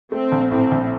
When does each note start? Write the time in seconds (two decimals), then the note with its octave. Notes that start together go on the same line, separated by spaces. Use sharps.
0.12 A3 C4
0.32 A#1
0.51 A2 C4
0.71 A#1